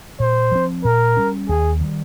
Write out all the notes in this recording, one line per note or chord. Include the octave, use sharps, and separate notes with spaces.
A#2 C5
F3 C4
A#2 A#4
G3 C#4
D#2 G#4
D#3 G3